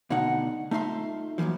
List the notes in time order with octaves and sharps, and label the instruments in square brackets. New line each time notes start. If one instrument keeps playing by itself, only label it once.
[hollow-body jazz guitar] B2 D3 A3 D#4 F#5
A3 D#4 F4 E5 C6
F#2 A#2 C#3 E3 F3